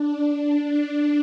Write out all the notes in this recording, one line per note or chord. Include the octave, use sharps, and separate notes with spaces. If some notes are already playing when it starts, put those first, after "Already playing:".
Already playing: D4
D4